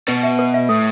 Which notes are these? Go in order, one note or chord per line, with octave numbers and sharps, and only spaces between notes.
B2 B4
E5
B4
E5
A2 A4